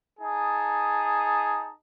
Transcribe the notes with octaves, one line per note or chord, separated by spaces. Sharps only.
D#4 G#4 A5